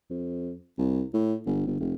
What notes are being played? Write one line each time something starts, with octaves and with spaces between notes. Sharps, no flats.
F2
C2
A2
G1
G1
F1